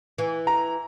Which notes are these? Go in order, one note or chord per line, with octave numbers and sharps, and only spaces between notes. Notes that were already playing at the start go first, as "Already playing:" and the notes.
E3
A#5